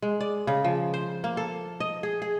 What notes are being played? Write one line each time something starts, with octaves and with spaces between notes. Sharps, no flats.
G#3
D5
C#3
F3
C5
A#3
A4
D#5
G#4
G#4